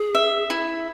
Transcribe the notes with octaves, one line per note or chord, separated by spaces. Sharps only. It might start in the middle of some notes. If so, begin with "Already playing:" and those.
Already playing: G#4
E5
E4